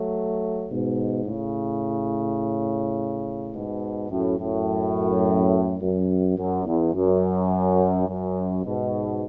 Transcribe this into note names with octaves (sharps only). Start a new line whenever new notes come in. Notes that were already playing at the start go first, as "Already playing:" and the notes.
Already playing: F#3 A3
G#2 B2
A2 C#3
G#2 B2
F#2 A2
F#2 A2
F#2
F#2
E2
F#2
F#2
G#2 B2